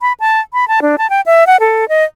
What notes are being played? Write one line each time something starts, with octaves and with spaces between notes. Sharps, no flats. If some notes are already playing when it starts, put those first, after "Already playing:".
B5
A5
B5
A5
D4
A5
G5
E5
F#5
A4
D#5